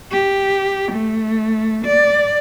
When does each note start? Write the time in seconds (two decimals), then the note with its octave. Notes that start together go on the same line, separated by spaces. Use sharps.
0.12 G4
0.92 A3
1.85 D5